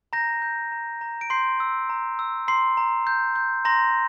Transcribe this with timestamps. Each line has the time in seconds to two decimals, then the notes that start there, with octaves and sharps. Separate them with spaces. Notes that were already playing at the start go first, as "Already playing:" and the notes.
0.13 A#5 G6 A#6
0.42 G6
0.72 A#5
1.01 A#5
1.21 D7
1.30 C6 G6 C7
1.60 E6
1.89 A#5
2.19 E6
2.48 A#5 C6 C7
2.77 A#5
3.07 G6
3.35 G6
3.65 A#5 C6 A#6